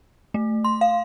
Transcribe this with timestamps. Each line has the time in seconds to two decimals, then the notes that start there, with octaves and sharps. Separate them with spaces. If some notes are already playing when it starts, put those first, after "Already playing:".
0.34 A3
0.64 C6
0.81 F5